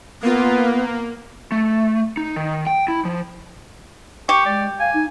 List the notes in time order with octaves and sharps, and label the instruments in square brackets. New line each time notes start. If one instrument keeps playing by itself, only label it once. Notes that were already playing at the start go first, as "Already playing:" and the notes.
[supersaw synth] A#3 F4 [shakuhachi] B3
[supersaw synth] A#3
[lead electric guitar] A3
D#4
D#3
G5
E4
F3
[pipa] G4 [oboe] C#6
[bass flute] G#3 [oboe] D5
[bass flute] F5 [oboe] G#5
[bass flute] D#4